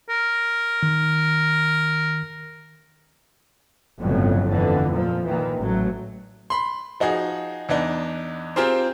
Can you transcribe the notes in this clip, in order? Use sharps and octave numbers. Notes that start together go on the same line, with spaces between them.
A#4
D#3
G1 F2 A2 C#3 F#3
F2 D3 E3
A#2 F3
A#2 D#3 E3
A1 F#3 A3
B5 C6
F3 D#4 F#4 G#4
E2 B3 D4 D#4
C4 F4 G4 G#4 A#4 C5